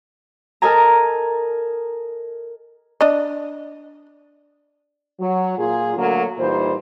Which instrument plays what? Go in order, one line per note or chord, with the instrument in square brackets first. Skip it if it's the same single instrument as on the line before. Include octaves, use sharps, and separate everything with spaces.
[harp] A4 A#4 D#5 G#5 A#5
[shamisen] D4 D#5
[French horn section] F#3
A#2 F4 G#4
D3 F#3 A3 A#3
A#2 E3 G3 D#4 C5